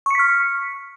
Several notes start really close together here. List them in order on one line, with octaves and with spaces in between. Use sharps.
C#6 C#7 B6 F6